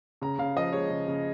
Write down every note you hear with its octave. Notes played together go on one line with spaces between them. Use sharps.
C#3 A#5
C#3 F5
F3 D#5
G#3 C#5
C#3
C#3